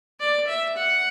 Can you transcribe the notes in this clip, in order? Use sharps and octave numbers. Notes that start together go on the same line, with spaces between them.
D5
E5
F#5